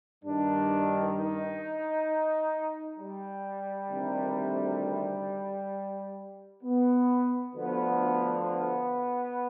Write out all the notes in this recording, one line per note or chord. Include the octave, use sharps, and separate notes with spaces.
G2 D#3 D4
D#4
G3
D2 C3 D#3
B3
D2 D3 F3 B3
B3